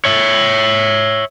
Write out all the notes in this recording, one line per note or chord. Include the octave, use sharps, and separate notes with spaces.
C#5 E5